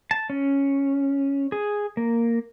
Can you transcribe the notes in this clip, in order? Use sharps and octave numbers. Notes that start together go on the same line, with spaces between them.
A5
C#4
G#4
A#3